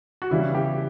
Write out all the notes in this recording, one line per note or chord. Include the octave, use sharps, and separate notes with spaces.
F#4
C#3 E3 G3 E4
G4